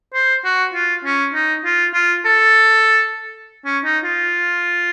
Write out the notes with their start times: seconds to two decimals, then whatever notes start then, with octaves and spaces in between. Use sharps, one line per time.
0.14 C5
0.45 F#4
0.74 F4
1.05 C#4
1.34 D#4
1.65 F4
1.94 F4
2.25 A4
3.65 C#4
3.84 D#4
4.04 F4